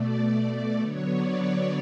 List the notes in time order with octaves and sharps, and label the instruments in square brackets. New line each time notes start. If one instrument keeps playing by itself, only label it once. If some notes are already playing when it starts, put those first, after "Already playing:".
Already playing: [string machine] B2 A3 D5
D5
D3 F#3 B3 C#5
D5
C#5